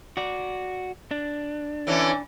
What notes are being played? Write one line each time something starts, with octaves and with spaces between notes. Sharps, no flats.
F#4 D5
D4
D3 E3 C#4